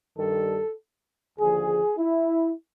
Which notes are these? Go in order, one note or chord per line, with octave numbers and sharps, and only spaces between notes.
G2 D#3 G3 A4
D#2 D3 F3 G#4
E4